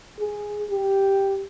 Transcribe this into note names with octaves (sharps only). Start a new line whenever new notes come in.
G#4
G4